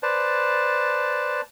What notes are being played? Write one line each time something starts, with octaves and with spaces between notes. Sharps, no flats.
B4 C5 D5 A5